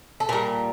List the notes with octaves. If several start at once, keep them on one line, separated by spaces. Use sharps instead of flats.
A4
A#2 G3 A#4